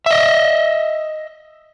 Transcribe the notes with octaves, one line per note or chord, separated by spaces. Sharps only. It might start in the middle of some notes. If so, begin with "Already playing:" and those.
D#5 E5